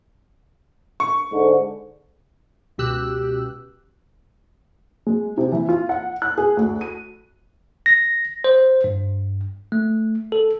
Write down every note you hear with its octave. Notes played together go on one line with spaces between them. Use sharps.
C#6
G#2 D3
C#2 B2 G4 E6 F#6
G#3
C3
E3
F4
F#5
F#6
G#4
D2
D#7
A#6
C5
G2
A3
A4